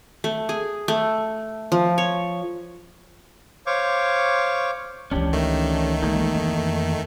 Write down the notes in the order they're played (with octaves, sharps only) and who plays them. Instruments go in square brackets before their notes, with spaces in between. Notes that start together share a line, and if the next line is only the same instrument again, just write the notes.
[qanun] A3
G#4
A3
F3
C#5
[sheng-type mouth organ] C5 C#5 F5 C#6 D6
[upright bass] C#2 E3 [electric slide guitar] C#4 D4 G4
[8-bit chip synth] D#3 A3
[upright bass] C#3 G#3 [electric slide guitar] E3 A#3 D#4
[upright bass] F2